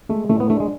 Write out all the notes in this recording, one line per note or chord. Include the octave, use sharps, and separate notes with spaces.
G#3 A3
A2 A3
B3
A3 D4
G#3